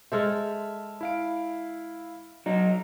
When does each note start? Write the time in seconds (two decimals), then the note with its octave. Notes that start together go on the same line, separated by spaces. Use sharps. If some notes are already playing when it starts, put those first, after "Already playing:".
0.12 G#3 A4 C5 E5 F6
1.01 E4 F5 D7
2.46 F#3 D#4